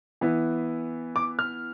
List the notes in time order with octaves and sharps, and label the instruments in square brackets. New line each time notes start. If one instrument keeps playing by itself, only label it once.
[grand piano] E3 B3 E4
D6
F6